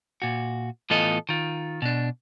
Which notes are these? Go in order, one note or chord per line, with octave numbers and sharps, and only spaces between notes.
A#2 F#4
A2 E3 B3 F4 A4 D#5
D#3 F4
B2 D4